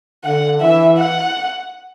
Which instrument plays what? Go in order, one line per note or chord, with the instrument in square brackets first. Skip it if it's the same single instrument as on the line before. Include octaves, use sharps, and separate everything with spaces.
[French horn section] D3 [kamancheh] F#5
[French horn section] E3 [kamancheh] E5
[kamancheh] F#5